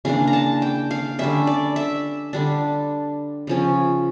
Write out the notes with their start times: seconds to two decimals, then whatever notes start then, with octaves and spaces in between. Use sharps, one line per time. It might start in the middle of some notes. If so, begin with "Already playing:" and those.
0.05 C#3 E3 A#3 D4 F5
0.27 A#5
0.33 A5
0.62 G5
0.91 F5
1.19 D3 G3 C#4 E5
1.47 D5
1.76 E5
2.33 D3 G3 D4
3.47 C#3 F3 C#4